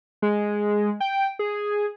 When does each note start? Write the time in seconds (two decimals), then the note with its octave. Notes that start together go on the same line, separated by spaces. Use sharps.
0.22 G#3
1.00 G5
1.39 G#4